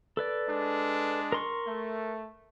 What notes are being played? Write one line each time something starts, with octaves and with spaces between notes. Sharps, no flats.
A4 B4 D5
G#3 D4
A#4 C6 C#6
A3